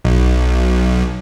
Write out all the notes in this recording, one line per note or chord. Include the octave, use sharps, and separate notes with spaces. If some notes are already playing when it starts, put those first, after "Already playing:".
B1